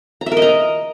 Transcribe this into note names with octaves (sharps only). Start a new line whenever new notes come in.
A#5
E5
A#4
D#5
A#5